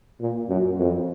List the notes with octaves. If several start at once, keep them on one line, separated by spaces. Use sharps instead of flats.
A#2
F#2
F2